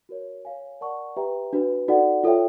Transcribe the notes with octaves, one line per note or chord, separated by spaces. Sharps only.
F#4 A#4 C#5
C#5 F5 G#5
A#4 D5 F#5 A5 C#6
G4 B4 E5 G5 A#5
D4 F#4 B4
D#4 F#4 A4 D5 F#5
F4 A4 C#5 E5 G5